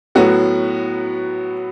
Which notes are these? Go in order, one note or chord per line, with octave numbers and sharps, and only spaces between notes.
A2 F#3 B3 F#4